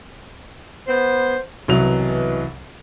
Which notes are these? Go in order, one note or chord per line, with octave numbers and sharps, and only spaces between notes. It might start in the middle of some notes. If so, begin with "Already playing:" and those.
B3 C5
C2 B2 E3 F#3 F7